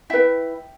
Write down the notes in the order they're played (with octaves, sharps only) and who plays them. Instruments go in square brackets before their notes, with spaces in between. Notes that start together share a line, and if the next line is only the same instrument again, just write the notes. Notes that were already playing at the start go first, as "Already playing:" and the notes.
[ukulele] E4 B4 E5 G5